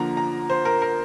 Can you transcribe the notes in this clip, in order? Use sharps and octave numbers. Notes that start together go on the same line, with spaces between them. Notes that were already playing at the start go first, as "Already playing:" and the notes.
Already playing: D3 F3 A#3 A#5
A#5
C5
A#4
A#4